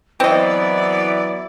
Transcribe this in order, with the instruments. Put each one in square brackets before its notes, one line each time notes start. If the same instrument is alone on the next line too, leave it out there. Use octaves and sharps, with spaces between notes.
[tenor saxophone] E3 [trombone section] F#3 B3 E4 [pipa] C4 D#5 [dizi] D5